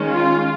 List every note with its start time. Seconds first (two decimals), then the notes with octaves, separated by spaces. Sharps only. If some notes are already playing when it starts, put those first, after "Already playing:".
Already playing: D#3 G#3 C#4
0.10 F4